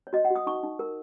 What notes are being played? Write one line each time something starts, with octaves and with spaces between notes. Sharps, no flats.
C#5
F#4 D#5
F#5
F#4 D#6
D#4 C#6
D#4
A#4